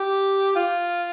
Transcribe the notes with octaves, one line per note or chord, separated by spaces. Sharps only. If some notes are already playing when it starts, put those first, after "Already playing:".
Already playing: G4
F4